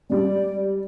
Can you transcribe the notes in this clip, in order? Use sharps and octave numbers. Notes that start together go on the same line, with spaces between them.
G3 G#3 D5